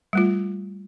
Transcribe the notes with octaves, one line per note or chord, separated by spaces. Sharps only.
G3 A3 F4